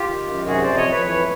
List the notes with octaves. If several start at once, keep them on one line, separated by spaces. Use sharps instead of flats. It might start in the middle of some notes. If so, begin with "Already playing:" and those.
Already playing: F4 G4
D#3
F#2
C3 F#4 G#4
F2 C5 D5
C#5 D#5
F2 B4 C#5
E3 B4 C#5